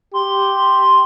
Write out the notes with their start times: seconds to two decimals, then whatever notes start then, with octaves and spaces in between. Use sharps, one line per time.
0.14 G4 C6